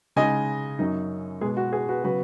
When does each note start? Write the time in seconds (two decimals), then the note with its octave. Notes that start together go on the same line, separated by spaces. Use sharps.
0.16 C#3 G#3 D#4 D#5 G#5
0.79 F#2 F#3 D#4
1.41 B2 G#3 B3 G#4
1.57 F#4
1.73 G#4
1.89 F#4 B4
2.04 C#3 F#3 B3 F#4 B4